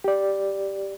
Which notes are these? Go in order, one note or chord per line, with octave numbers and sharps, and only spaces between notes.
G4 D5